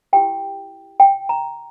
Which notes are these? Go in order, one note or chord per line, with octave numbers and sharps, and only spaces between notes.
E4 G4 A#4 G5
G5
A#5